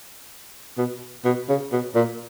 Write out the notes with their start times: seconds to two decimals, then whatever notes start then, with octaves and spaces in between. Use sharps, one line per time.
0.78 B2
1.25 B2
1.49 C#3
1.72 B2
1.95 A#2